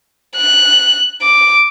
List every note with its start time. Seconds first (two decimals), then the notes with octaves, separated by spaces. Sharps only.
0.37 F#6
1.22 D6